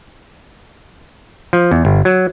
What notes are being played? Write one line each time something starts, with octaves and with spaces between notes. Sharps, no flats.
F3
E2
G1
F#3